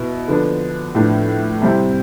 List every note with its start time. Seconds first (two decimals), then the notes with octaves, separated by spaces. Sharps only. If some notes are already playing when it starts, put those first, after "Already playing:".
Already playing: B2 B3 E4
0.28 D3 F3 B3 D4
0.95 A2 F3 B3 D4
1.62 C3 G3 C4 E4